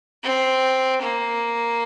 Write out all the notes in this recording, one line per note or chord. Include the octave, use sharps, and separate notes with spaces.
C4
A#3